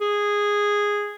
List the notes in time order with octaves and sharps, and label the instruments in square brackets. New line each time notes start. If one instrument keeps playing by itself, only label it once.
[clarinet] G#4